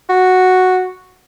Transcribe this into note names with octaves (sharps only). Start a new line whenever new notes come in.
F#4